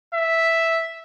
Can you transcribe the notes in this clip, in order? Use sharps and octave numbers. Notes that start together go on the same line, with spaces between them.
E5